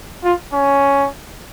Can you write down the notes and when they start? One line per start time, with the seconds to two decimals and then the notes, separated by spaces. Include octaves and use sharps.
0.24 F4
0.53 C#4